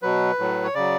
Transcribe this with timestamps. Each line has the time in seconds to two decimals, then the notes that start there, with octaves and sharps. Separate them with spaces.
0.02 B2 F#3 B4
0.39 A2 F#3
0.64 C#5
0.75 C#3 F#3 D5